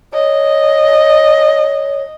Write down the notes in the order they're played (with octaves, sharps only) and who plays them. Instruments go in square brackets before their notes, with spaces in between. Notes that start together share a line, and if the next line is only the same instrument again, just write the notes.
[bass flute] C#5 [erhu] D#5